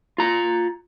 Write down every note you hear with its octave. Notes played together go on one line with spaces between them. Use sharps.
F4 A#5